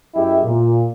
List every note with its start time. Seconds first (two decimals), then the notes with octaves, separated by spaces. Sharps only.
0.15 F#2 E4 G4 G#4 D#5 E5
0.44 A#2